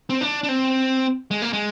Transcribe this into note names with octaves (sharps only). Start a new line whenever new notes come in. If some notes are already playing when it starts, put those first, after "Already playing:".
C4
D4
D4
C4
G#3
A#3
G#3